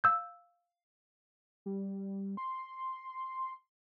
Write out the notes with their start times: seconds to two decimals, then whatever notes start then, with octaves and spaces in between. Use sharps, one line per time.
0.04 F5 E6 G6
1.66 G3
2.37 C6